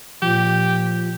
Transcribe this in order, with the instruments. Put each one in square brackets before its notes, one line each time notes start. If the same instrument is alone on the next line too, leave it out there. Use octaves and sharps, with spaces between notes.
[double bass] A#2 [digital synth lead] F3 [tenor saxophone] G4